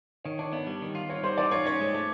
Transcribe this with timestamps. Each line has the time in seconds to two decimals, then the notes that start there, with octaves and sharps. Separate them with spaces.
0.25 D#3 C#5
0.39 D4 C#5
0.53 B3 D5
0.67 G3
0.82 D#3
0.95 F4
1.09 C4 C#5
1.23 G3 C5
1.38 E3 D5
1.51 F4 C#5
1.65 C#4 C#5
1.81 G#3
1.94 A3